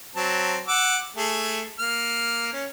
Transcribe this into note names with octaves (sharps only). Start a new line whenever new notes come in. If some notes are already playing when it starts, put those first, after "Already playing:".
F#3 C4 A5
F#5 D6 E6
A3 G#4
A#3 F6
C#4